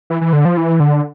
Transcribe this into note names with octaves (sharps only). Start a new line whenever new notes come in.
E3
E3
D3
F3
E3
D3